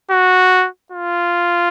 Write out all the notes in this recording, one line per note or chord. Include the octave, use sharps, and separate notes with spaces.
F#4
F4